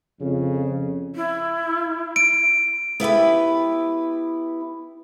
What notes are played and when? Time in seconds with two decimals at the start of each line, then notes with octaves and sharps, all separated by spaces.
0.21 F2 C#3
1.16 E4
2.16 D7
3.00 B3 E4 G4 B4